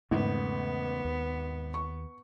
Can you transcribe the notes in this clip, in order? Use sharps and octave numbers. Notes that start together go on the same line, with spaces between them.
G#1 E2 C#3 A3 B3
D#2
C#6